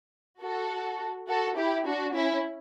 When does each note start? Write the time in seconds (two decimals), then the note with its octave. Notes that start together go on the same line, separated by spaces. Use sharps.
0.42 F#4 A4
1.28 F#4 A4
1.57 E4 G4
1.86 D4 F#4
2.14 C#4 E4